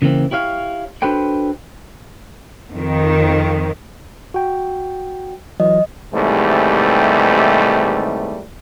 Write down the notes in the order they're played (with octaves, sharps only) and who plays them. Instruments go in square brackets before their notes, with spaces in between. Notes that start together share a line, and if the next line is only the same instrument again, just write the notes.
[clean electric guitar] C#3 E3 A#3 C4
E4 G4 C#5 F5
D4 F#4 A4 B4 C5 G5
[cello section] F2 D#3
[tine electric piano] F#4 G5
[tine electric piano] E3 F#3 [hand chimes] D#5
[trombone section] D#2 G#2 C3 E3 G3 A3